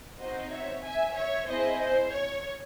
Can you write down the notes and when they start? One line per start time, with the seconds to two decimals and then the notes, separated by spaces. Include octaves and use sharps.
0.19 C4 D#4 F#4 C5 D#5
0.51 C#5 E5
0.83 E5 G#5
1.15 C#5 E5
1.47 C4 E4 G#4 C5 D#5
1.80 C5
2.12 C#5